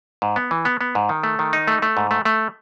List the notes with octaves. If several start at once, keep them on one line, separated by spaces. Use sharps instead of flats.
G#2
B3
E3
B3
B3
G#2
D#3
A3
D#3
D#4
A3
A3
G#2
A3
A3